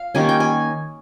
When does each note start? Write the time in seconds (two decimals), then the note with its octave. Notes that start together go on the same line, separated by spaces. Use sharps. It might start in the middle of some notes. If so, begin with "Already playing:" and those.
Already playing: F5
0.15 D#3 G3 A#3 C#4 G#5
0.29 G5
0.40 G#5